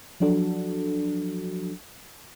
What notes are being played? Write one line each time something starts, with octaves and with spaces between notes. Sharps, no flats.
F3 F#3 D4 F#4 A4